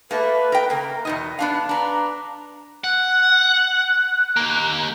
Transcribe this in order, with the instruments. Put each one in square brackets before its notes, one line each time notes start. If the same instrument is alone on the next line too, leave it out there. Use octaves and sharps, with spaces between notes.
[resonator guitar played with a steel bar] A3 A#3 [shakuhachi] B4
[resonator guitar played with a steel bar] A#4 G5
[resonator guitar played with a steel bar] C#3 A#3 [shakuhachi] A#4
[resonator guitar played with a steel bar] E2 B2 D#5 [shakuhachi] D#4
[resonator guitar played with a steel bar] B3 D4 F5 [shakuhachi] A5
[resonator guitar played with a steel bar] D4 B4 [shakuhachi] A#5
[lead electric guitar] F#5 [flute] F#6
[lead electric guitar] D#2 A#3